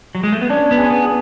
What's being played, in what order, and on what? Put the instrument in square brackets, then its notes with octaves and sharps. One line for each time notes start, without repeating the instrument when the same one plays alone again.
[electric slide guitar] F#3
G#3
A3
B3
[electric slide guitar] C#4 [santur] D4
[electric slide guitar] B3
[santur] G#4
[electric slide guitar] C#4
B3
[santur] G#4